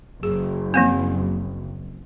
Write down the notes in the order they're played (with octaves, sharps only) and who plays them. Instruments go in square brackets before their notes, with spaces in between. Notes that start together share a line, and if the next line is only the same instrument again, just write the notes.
[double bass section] F#1 [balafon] G#4
[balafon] F3 A#3 C4